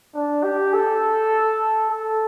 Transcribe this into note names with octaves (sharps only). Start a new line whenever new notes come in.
D4
G4
A4
A4